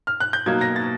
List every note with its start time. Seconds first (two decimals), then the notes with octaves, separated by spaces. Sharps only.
0.07 F6
0.20 F#6
0.33 G6
0.46 B2 F#3 A#3 D#4 G#6
0.61 A#6
0.76 A6